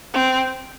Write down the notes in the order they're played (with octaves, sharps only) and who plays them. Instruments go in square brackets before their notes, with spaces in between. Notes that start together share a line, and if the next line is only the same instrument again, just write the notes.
[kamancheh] C4